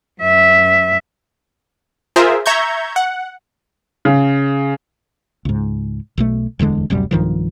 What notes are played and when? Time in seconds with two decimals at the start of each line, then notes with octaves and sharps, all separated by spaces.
0.21 F#2 E5
2.16 F4 G#4 A#4 C5 E5
2.46 E5 A#5 C#6 G6 G#6
2.96 F#5
4.05 C#3
5.45 C#2 G#2
6.17 B1 B2 A3
6.59 D1 E2 D3 G#3
6.90 D1 F#2 C3 G3
7.11 B1 G2 D#3 F3